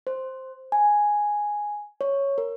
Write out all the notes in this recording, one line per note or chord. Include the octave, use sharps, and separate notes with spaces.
C5
G#5
C#5
A#4